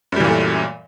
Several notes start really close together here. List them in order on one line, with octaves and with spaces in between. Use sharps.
F#2 G3 E3 A#2 A3